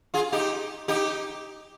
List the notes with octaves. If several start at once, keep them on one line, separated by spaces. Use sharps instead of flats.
F4 G#4
D#4 G4
D#4 G4